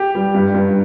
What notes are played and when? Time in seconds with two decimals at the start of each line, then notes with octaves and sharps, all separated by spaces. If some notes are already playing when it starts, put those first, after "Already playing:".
Already playing: G4
0.15 G3
0.34 G2
0.54 G2